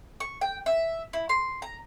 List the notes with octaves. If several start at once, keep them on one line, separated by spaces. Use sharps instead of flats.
C#6
G5
E5
E4
C6
A#5